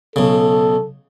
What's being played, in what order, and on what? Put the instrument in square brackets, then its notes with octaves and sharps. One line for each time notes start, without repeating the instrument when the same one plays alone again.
[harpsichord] B1 C#3 [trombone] A4